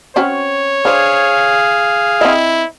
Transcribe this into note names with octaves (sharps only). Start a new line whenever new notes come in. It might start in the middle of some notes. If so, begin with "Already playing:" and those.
C4 C#4 F#4 C#5
D4 G#4 C5 F5
C4 E4 D#5